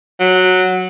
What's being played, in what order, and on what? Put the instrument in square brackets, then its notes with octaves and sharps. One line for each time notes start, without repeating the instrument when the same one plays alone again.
[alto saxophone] F#3